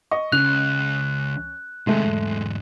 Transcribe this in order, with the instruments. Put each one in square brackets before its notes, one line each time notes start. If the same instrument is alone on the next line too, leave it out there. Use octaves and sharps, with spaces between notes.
[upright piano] D#5 C#6
[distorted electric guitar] C#2 [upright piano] C#4 F7 [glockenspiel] F#6
[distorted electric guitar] C3 D#3 [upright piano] G#3 A3
[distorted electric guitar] E2 G#2